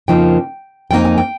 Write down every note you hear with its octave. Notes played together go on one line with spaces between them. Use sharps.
F2 C#3 F3 A#3 D#4 G5
F2 C#3 F3 A#3 D#4 G5
G#5
G5